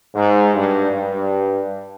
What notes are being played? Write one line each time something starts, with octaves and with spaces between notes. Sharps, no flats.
G#2
G2
G2